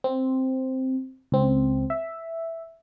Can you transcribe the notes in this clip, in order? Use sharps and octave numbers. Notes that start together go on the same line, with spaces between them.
C4
C#2 C4
E5